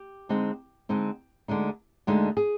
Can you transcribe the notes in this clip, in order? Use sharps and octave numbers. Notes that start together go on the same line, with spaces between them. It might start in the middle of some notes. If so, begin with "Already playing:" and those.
Already playing: G4
D3 G#3 C4 D#4
D3 G#3 C4 D#4
D2 D3 G#3 D#4
D2 D3 G#3 D#4
G#4